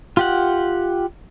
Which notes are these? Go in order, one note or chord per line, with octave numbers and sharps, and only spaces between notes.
F4 G4 F#5